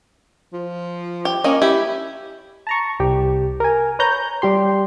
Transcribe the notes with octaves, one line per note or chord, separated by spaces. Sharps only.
F3
G4
A#3 C#4 D#5
E4 G4
A5 A#5 C#6
C2 G4
A#4 G#5
B4 C#5 A#5 G6
G3 G4 C6